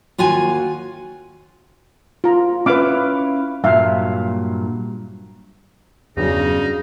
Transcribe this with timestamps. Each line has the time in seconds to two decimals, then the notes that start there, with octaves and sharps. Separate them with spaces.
0.18 D#2 F4 F#4 G#5
2.24 F4 A#5
2.66 C#4 E4 B4 F5 D6
3.64 G2 A#2 F#3 E5 F5
6.17 E2 G2 C#3 F#3 G3 D#4